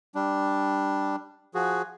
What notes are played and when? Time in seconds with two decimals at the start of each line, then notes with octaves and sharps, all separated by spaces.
0.15 G3 D4
1.54 F3 F#4 G#4